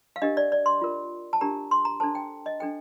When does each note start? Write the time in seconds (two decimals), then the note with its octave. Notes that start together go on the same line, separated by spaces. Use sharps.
0.16 F5
0.22 D4 G4 A#4 D#5
0.37 D5
0.52 D5
0.66 C6
0.81 F4 A#4
1.33 A5
1.41 D4 G4 A#4 A#5
1.71 C6
1.85 A#5
2.00 D4 A4 C5 A5
2.15 G5
2.46 D#5
2.60 D4 A4 C5 G5